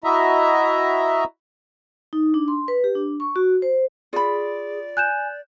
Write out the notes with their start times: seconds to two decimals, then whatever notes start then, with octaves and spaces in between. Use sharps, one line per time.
0.04 E4 F#4 D#5 E5 A#5
2.13 D#4
2.34 D4
2.48 C6
2.68 B4
2.84 G4
2.95 D4
3.20 C#6
3.36 F#4
3.62 C5
4.13 F4 G#4 D5 B5
4.97 G#5 F#6 G6 E7